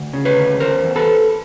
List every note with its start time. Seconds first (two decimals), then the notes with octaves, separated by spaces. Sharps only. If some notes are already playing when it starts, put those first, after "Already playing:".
Already playing: D2
0.13 C#3
0.25 B4 C#5
0.37 D2
0.60 E2 A#4 C5
0.84 E2
0.96 A4 B4